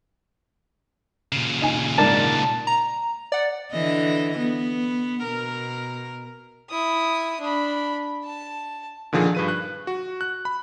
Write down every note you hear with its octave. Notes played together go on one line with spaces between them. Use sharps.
A#2 C#3
D#4 G#5
G#2 A#4 D5 A5
A#5
D5 F#5
D3 E3 D#5
B3
B2 A#4
E4 D#6
D4 B5
A5
A#2 D3 D#3 F3 G#4
G2 B4 D#7
F#6
F#4
F#6
B5